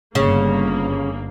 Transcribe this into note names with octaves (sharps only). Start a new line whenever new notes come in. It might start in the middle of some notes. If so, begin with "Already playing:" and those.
G1 G2 C#3 A#3